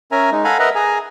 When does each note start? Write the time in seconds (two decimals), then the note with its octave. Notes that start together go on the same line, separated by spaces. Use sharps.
0.12 C#4 A#4 E5 G#5 A#5
0.32 G#3 D#4
0.44 A4 F5 F#5 G#5 A#5 B5
0.59 A#4 B4 D#5 E5 F#5 A#5
0.75 G#4 G#5 A#5